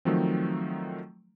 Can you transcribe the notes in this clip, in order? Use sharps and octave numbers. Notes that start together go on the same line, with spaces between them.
D#3 F3 F#3 A3 C4